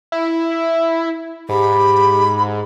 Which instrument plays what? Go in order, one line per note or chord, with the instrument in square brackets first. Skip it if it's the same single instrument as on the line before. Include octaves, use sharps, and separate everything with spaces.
[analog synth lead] E4
[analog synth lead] G#2 [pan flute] G4 [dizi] B5